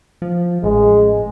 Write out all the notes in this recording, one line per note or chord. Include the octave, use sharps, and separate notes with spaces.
F3
A1 G#3